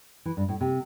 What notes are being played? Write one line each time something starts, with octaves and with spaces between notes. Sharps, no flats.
E3
G2
A2
C3